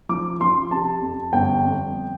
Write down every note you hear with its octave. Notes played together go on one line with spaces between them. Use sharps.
F3 D6
F3 C6
C3 A5
F2
G1 G5
F2